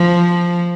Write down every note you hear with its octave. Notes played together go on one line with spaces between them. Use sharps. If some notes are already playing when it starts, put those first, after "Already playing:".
Already playing: F3